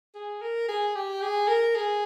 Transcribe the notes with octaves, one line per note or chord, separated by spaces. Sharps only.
G#4
A#4
G#4
G4
G#4
A#4
G#4